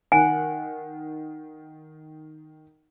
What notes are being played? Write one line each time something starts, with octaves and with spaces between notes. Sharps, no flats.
D#3 F#5 G#5